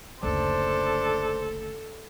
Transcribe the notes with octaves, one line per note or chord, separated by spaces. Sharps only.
F#1 D2 D4 A4 C5